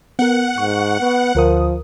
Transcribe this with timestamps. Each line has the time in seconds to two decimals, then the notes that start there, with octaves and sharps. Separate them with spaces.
0.19 B3 A#4 F#5
0.58 G#2 C#6
1.00 B3
1.35 D2 F3 A#4 D#6